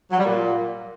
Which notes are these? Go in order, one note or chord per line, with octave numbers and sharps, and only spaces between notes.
F#3
G3
A#2